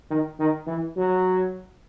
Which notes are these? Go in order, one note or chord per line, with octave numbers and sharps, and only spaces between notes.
D#3
D#3
E3
F#3